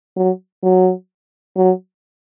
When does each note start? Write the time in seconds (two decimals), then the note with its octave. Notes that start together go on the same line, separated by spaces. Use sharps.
0.16 F#3
0.63 F#3
1.57 F#3